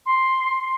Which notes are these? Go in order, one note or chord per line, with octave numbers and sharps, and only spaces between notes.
C6